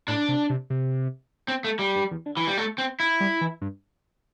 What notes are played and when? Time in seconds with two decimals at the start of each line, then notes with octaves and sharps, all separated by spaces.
0.08 A2 D4
0.28 C3
0.50 C3
0.70 C3
1.48 C4
1.64 A3
1.79 G3
1.96 G2
2.11 E2
2.26 D3
2.37 E3
2.47 G3
2.57 A3
2.78 C4
3.00 E4
3.20 G3
3.41 E3
3.61 G2